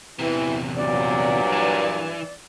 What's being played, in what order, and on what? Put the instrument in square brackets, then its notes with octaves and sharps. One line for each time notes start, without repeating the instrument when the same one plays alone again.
[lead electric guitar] E2 C3 [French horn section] E3
[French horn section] G2 A#2 F#3 [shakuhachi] D5
[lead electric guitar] E3